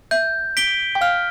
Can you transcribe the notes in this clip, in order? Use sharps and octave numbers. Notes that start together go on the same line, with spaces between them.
E5 G6
B6 D7 G7
G5
F5 F6